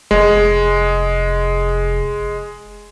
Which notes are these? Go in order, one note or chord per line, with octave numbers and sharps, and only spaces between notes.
F1 G#3